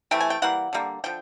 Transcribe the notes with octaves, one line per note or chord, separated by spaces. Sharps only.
C3 E3 A3 G5
G#5
G5
E3 G3 A#3 F#5
D3 G3 A#3
D3 F3 G5